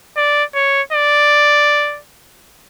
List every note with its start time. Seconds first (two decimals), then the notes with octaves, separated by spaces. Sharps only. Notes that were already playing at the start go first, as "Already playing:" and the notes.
0.17 D5
0.55 C#5
0.92 D5